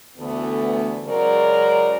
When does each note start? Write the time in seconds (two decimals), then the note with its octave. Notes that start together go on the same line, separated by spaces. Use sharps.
0.18 D2 D3 E3 A3 B3
1.05 C#3 F#3 G#3 A#4 C5 D5